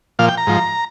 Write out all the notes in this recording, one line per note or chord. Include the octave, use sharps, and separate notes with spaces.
A#2 F3 F5
G5
A#5
G#2 F3